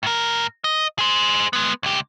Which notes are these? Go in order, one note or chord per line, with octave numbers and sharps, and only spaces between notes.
A2 A#4
D#5
G#4 C5
G#3 B3
C#2 G4